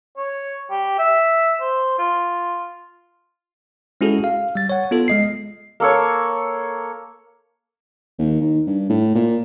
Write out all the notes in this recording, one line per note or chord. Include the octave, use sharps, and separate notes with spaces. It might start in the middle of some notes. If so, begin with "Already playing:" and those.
C#5
G4
E5
C5
F4
G#3 C#4 E4 F#4 G#4 A4
F5
G3 A6
C#5 F#5
B3 F4 A4
G#3 D#5 C7
A#3 A4 C#5
D#2
D#3
G2
A2
A#2